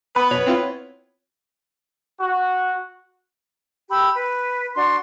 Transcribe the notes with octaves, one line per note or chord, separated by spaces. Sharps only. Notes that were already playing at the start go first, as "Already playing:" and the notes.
B3 B4 B5
F#2 B2 C#5
C4 E4 F4
F#4
G4 B5 E6
B4
D4 F#4 C6